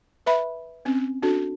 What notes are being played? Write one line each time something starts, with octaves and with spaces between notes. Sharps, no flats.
B4 E5 B5
C4 C#4
D4 F#4 A4